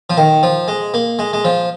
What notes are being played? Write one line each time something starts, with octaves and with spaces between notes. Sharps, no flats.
F3
D#3
F3
G#3
A#3
G#3
G#3
F3